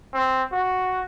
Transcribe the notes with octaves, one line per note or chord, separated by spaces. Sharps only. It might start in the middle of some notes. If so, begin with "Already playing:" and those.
C4
F#4